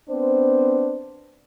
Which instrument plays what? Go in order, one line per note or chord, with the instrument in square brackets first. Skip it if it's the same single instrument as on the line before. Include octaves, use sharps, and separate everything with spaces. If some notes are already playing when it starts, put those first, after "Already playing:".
[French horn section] B3 C4 D4 C5